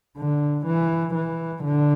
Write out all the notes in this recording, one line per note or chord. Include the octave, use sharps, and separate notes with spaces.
D3
E3
E3
D3